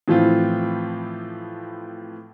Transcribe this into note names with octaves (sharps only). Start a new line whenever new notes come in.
A2 E3 F3 C4 F4